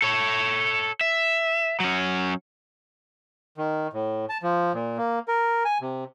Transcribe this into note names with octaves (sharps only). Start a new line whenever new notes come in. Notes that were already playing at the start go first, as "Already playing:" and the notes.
A4 C#5
E5
F#3 C#4
D#3
A2
A5
F3
A#2
A#3
A#4
G#5
C3